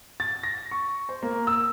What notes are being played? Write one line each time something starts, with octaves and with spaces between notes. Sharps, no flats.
A6
A#6
C#6
C5
A#3
E6